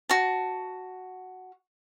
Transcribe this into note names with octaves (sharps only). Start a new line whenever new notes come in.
F#4 A5